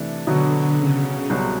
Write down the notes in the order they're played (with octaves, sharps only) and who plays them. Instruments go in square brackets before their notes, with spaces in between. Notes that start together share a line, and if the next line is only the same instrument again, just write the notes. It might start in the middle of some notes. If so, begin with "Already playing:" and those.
Already playing: [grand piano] C3 E3 A3 D4
[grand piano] B2 F#3 B3 [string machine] D3
[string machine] C#3
[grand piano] C2 B2 F#3